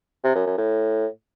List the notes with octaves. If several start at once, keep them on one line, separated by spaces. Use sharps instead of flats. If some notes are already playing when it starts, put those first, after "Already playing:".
C3
F#2
F#2
A2